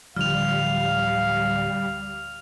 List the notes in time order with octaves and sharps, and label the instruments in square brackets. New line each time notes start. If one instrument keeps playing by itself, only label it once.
[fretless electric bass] D1 D3 F3 [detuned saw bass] G3 [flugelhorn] F5 [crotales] F6 F7